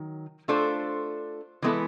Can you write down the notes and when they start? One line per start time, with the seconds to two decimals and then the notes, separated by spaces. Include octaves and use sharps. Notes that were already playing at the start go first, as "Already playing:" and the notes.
Already playing: D#3 F#3
0.48 A3 D4 F4 A4 C5
1.62 E3 G#3 B3 E4 A4